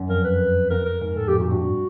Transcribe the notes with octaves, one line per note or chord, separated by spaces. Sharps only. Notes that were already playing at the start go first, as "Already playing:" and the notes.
Already playing: F#2
F2 A#4
B4
F2 A#4
A#4
G#2 A#4
A2 A4
F2 G4
A#2 F#4
G2 F#4